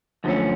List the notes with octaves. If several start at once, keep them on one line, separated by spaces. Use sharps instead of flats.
F#2 D3 F3 A3 C#4